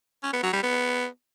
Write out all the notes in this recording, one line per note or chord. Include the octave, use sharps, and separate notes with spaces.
C#4
B3
F#3
G3
B3